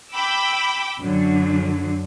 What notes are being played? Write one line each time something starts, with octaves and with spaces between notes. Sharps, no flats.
G5 B5 D6 E6
F#2 D3 F#3